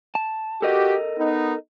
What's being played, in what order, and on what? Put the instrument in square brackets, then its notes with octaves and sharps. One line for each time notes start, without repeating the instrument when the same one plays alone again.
[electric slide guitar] A5
[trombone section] F#4 G4 [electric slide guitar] A4 A#4 D#5
[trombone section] B3 D#4